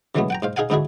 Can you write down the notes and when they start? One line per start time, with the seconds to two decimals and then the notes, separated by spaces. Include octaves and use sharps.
0.15 C#3 E3 F#3 G#3 A3 B3
0.30 F#5 G5 A#5
0.43 G#2 C5 F5
0.56 D#4 G#4 F5 F#5 G#5
0.70 G#2 D3 D#4 E4 F#4 G#4